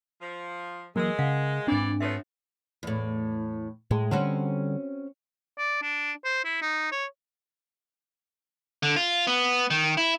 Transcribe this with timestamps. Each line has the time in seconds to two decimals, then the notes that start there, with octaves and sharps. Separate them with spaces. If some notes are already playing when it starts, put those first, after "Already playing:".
0.21 F3
0.96 E3 F#3 G#3 A#3 A#4 E6
1.19 C#3 F5 F#5
1.67 G#2 E3 C4 D4 D5
2.00 F3 A3 B3 C#5 E5
2.83 E2 A2
3.91 A2 G#3
4.11 D3 G3 C4 C#4 F#4
5.58 D5
5.82 D4
6.24 C5
6.45 E4
6.62 D#4
6.92 C#5
8.83 D3
8.96 F4
9.27 B3
9.70 D#3
9.97 E4